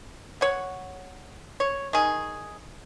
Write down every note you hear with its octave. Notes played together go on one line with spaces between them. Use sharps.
C#5 F#5
C#5
D#3 G#4